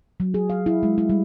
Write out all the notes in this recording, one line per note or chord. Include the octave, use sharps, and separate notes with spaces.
F#3
G#4
F5
E4
G#3
E4
G3